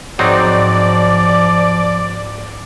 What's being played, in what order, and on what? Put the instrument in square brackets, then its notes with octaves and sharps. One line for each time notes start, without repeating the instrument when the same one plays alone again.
[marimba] G#2 [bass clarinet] F3 [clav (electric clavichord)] F#3 C4 D#4 [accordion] D5